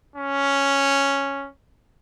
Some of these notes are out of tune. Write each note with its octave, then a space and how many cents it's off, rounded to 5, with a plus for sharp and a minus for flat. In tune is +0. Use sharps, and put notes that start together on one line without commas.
C#4 +0